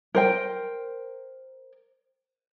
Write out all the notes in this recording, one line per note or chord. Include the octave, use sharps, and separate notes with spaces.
A#4 C5 G5